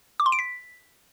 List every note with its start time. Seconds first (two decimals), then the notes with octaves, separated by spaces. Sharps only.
0.20 D6
0.26 C6
0.32 D7
0.39 B6